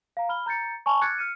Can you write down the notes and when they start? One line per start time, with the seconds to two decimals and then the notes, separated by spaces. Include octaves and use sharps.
0.17 F5 A#5
0.29 B5 F6 G7
0.46 A#5 G6 A6 C#7
0.86 G#5 A5 B5 C#6
1.01 D6 F6 F#6 G#6 A6 C#7
1.18 F6 C#7 D#7